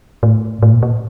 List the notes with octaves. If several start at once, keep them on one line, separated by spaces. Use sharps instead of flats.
A2
A2
A#2
A#2